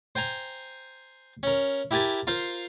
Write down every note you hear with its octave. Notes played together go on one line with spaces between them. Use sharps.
C5 G5 G#5 A#5
C#4 A#4
E4 G4 A#4 G#5 A5
F4 A#4 C5 F5